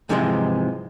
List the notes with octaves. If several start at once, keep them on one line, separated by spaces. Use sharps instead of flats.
G#2 C3 E3 F3 G3 G#3